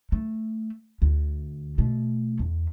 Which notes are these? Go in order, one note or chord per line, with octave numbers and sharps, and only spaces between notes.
A3
D2
B2 A3
E2